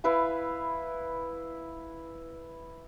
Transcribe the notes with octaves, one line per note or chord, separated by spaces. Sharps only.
E4 B4 F5 G#5